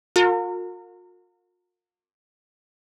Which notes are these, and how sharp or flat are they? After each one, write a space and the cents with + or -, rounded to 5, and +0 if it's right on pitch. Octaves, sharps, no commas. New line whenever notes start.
F4 +45 A#4 -35